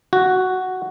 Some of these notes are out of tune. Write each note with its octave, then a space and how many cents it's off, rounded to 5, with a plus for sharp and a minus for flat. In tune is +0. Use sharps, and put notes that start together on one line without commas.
F#4 +5